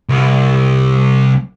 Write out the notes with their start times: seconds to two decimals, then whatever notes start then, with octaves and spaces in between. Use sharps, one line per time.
0.09 C2